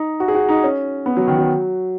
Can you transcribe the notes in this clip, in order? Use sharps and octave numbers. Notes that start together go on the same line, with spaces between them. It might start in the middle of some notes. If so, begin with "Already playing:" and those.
Already playing: D#4
F#4
G#4
F#4
D#4
C#4
B3
F#3
D#3
F#3